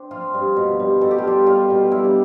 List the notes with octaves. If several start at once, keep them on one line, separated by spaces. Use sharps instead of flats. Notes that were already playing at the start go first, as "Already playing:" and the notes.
Already playing: C4 D4
F3 F4
G2
B2
G3
B2 A4
G4
F4
G3 G4
G3 F4
B2
G3 E4
D4